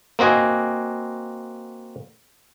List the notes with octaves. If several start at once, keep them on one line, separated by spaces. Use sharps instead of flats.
A#3 C4 F#4 D#5 G#5